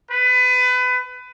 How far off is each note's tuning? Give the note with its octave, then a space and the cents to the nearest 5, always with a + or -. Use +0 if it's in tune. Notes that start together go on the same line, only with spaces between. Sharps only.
B4 +25